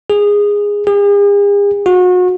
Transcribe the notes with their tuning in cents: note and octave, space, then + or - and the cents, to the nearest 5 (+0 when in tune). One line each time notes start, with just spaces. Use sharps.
G#4 -15
G#4 -45
F#4 -35